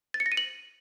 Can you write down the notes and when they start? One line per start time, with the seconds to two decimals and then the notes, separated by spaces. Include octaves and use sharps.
0.14 A6
0.20 C#7
0.26 A#6
0.32 D#7
0.37 F#7